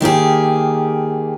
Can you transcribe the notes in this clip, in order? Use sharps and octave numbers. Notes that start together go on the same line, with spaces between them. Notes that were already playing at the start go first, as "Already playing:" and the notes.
D#3 A#3 G4 G#4